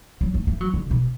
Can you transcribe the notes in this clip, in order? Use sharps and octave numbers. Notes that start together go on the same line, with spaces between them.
F#3
A3
A3
F#3
D3
B2